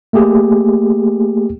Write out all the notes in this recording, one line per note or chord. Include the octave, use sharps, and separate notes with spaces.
A3 A#3 G4 G#4